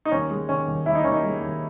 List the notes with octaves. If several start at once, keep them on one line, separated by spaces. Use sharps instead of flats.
D#4
D#2 C#4
G#3
D#3 C#4
D#2
D#2 E4
D#4
D#2 C#4
D#4
G#3
D#2